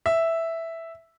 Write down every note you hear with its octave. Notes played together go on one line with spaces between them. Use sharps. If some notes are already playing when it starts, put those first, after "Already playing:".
E5